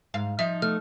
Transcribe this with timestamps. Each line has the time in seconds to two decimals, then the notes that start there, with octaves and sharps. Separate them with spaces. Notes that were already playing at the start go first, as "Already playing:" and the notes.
0.14 G#2 F5
0.39 F3 D#4 E5
0.62 A3 F6